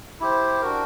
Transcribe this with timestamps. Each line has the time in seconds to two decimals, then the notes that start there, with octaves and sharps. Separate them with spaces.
0.20 E4 G4 C5
0.62 D4 F#4 A#4